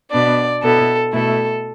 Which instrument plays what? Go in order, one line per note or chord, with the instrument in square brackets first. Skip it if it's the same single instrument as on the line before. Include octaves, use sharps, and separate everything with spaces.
[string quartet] B2 B3 D4 D5
B2 B3 E4 A4
B2 A3 E4 A4